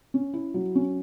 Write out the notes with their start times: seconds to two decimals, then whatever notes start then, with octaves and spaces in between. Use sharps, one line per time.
0.14 C#4
0.34 E4
0.54 F#3
0.75 C#4